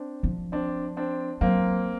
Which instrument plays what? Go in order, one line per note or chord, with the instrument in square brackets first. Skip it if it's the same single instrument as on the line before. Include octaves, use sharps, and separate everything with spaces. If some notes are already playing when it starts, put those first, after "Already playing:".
Already playing: [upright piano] C4 D4
[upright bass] F3
[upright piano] C4 D4
C4 D4
[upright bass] F#3 [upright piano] A#3 C4